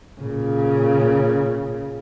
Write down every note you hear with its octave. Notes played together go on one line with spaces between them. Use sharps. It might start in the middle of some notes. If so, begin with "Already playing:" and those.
A#2 C#3